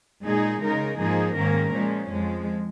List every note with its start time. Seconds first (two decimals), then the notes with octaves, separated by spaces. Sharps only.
0.25 A#2 G#3 D#4 G#4
0.61 C#3 G#3 D#4 A#4
0.99 G#2 F3 A#3 D#4 G#4
1.37 G#2 D#3 A#3 C#4 A#4
1.74 A#2 F3 G#3 C#4
2.11 F2 F3 G#3